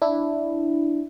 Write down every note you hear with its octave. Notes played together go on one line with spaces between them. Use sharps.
D4 E4